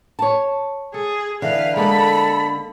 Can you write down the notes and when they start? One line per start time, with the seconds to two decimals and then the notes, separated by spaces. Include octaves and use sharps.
0.19 C#5 A5
0.94 G#4 A4
1.42 D3 E3 B4 F5
1.76 G#3 A#3 B3 A4 B5